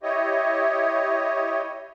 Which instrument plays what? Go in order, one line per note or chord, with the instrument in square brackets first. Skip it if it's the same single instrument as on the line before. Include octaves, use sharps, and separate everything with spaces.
[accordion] E4 G4 C#5 D#5